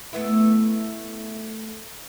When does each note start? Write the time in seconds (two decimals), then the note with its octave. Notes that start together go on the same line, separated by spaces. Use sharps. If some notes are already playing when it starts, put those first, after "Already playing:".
0.13 A3 B3 E4